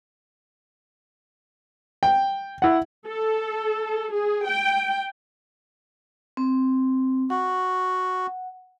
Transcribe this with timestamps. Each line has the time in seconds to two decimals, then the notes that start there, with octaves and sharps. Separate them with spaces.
2.03 G5
2.62 E4 F#5
3.08 A4
4.14 G#4
4.47 G5
6.37 C4
7.30 F#4 F#5